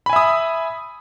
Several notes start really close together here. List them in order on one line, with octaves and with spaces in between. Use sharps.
B5 G#5 E5 D#6